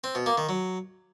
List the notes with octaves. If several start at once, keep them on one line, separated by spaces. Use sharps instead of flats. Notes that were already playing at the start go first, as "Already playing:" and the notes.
C4
B2
A#3
D#3
F#3